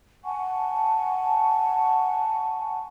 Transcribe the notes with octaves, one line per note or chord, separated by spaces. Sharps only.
F#5 G#5 A5 C#6